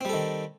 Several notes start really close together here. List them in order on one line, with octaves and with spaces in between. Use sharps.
C4 G3 A4 D#3